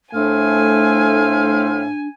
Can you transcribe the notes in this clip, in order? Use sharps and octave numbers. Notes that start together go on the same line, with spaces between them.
A2 A3 C4 D4 F5 G#5